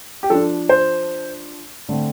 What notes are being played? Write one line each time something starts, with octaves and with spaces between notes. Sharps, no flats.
G4
F3 D4 A4
C5
D3 A3 C4